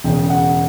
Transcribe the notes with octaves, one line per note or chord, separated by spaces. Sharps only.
E1 E2 C#3 G5
F#5